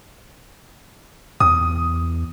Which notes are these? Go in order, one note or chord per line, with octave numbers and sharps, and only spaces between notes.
E2 D#6